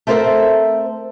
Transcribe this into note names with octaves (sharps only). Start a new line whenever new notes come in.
A3 C4 A4 A#4 C5 E5